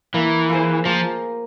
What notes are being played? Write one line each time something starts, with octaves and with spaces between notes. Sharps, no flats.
E3 A#3
F4 G#4 C5
F3 A#3